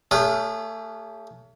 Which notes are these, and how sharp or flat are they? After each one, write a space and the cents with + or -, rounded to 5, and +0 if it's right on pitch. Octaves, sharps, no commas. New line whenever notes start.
A3 +25 C#4 +35 G#4 -35